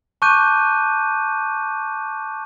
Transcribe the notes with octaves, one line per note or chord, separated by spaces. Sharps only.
A5 C#6 D6 F#6 G6 D#7